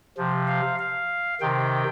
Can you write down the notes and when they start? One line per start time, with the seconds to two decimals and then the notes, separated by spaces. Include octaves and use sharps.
0.17 C3 F3
0.48 F5
0.79 F5
1.41 C3 D#3 G5